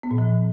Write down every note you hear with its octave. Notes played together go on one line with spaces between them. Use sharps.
B3
A#2
F3